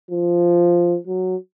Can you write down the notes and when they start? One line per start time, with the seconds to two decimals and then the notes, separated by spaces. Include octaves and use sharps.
0.11 F3
1.07 F#3